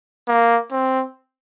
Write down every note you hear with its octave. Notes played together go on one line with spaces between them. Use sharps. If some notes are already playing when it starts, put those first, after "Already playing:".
A#3
C4